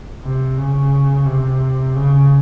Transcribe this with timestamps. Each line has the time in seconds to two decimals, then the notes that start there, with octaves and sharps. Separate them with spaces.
0.23 C3
0.58 C#3
1.27 C3
1.96 C#3